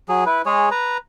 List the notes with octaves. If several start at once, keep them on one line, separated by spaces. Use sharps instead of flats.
F#3 G#4
E4 B4
G#3 G#4 C#5
B4 A#5